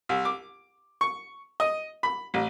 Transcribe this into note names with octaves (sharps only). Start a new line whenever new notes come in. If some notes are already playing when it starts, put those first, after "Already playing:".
C2
D6
C#6
D#5
B5
A1